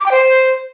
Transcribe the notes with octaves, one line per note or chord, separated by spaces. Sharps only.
D6
G5
C5